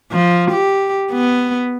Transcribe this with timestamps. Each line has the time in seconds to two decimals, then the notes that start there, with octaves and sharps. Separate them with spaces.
0.12 F3
0.51 G4
1.12 B3